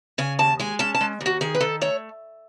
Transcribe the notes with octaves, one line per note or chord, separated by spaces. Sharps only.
C#3 G#5
D#2 A5
G#3 G#5
C#4 A5
A5
G#3
D#2
F#4
D#3 G#4
B4
D#3 A4
A3 C#5